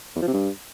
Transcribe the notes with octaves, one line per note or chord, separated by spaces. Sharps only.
E2
F3
C3
G2